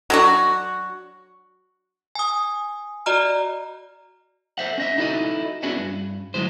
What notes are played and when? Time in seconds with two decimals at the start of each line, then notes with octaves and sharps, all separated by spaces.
0.10 F#3 D4 F#4
2.15 G#5 D#6
3.06 F#4 D5 D#5 A#5 F6
4.58 A4 C5 E5 F#5
4.78 C#4 D#5 E5
4.98 D#4 E4 F#4 A4 D5 D#5
5.63 B3 C#4 D4 E4 F#4 G#4
5.79 G2
6.34 D2 G#2 F#3 G#3 E4 C5